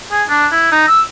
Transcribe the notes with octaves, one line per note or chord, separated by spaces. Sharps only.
G#4
D4
E4
D#4
E6